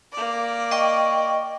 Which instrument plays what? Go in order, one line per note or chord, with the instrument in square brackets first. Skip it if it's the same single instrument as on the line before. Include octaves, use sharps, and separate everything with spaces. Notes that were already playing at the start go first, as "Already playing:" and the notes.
[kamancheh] A#3 D5
[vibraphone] D#5 G5 C#6